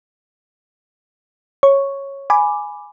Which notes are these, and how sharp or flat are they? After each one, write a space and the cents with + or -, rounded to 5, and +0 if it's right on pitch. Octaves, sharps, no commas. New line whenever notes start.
C#5 -10 C#6 +0
G#5 +0 B5 +0 D6 +0